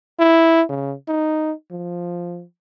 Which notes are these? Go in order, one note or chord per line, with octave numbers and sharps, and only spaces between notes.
E4
C#3
D#4
F3